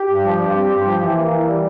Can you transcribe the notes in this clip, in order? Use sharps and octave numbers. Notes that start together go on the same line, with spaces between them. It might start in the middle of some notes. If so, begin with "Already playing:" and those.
Already playing: G4
G2
F3
G2
C4
G2
F3
E3
A#3
E3
G3